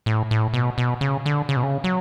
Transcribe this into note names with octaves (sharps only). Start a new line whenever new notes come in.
A2
A2
B2
B2
C#3
D3
C#3
B2
C#3
F#3